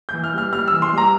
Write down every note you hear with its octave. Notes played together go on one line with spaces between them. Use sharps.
E3 G6
F6
G3 F6
G3 F6
E3 E6
C6
G3 A#5